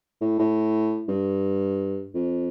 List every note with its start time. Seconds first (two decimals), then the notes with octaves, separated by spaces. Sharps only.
0.21 A2
0.39 A2
1.08 G2
2.14 F2